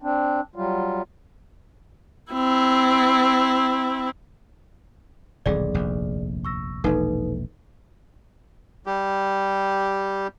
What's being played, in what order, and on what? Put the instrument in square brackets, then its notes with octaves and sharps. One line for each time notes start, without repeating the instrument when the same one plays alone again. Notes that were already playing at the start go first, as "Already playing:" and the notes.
[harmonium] C4 D4
F#3 G3 F4
[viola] C4 E4
[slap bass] D#1 B1 D3 [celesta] G#4 D5
[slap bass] F1 A#1 D#2
[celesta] C#6 E6 A#6
[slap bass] E1 A#1 [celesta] D#4 A4 B4
[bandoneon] G3 G4